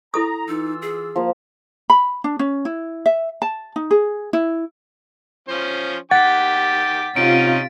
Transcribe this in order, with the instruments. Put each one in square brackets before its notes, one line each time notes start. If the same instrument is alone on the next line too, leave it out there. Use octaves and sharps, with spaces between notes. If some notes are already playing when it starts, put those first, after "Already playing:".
[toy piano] E4 A4 D#6 [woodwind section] A#5
[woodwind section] E3 F4 E6 [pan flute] D#4
[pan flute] G#4
[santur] F3 A#3
[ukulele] B5
D4
C#4
E4
E5
A5
D#4
G#4
E4
[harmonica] F3 C#4 C5
[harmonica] D#3 G5 D6 [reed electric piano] F#5 [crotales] A6 B6
[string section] C3 F4 [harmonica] C#4 D#4 [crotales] D7